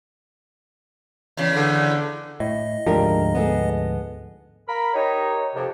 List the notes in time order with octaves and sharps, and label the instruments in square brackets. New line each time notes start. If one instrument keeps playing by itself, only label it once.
[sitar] E2 C#3
[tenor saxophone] D3
[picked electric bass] A2 [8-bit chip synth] D#5
[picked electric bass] D2 G#2 F3 [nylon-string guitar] D4 G4 A#4
[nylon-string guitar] B3 G#4 A4
[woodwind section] A#4 F5 A#5 B5
D#4 G4 A#4 C#5
F2 C3